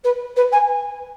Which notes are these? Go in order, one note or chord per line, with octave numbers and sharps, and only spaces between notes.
B4
B4
G#5